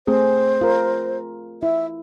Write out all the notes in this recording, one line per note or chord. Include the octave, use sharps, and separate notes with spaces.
A3 C4 G#4 C5
F4 A#4
E4 E5